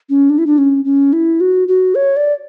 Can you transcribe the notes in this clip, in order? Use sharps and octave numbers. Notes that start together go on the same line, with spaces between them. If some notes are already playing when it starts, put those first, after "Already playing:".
C#4
D4
E4
D4
C#4
C#4
E4
F#4
F#4
C#5
D5